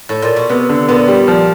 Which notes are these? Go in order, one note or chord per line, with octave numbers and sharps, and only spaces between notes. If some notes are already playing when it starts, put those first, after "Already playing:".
A2
A#2
B2
C3 B3
D3
A#2 B3
G3
F3